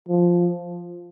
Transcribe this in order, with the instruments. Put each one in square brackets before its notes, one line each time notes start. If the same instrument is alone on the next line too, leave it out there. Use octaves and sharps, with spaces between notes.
[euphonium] F3